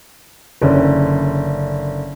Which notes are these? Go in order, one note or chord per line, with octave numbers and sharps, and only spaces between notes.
F#1 D3 C#4